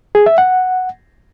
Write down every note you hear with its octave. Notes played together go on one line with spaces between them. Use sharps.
G#4
E5
F#5